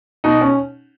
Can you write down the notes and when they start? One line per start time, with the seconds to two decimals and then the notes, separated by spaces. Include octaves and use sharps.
0.24 B2 D#4
0.41 C#4